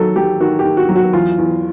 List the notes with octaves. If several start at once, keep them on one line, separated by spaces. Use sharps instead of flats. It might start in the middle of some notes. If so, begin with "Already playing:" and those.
Already playing: D#3 F#3 A4
F#3 G4
D#3 F#4
G4
D#3
F#4
F#3
F#4
E2 F4
E2